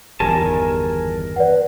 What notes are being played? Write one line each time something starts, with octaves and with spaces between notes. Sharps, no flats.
G1 E2 D#3 G4 A#4 G#5 A5
B4 D5 F#5